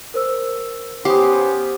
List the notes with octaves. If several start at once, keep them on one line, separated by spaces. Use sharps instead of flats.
A#4 C5 E6
B3 C#4 G4 C5 D6 D#6